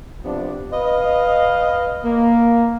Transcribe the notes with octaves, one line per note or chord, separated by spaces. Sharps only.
C3 F3 B3 D4
B4 D#5 F5
A#3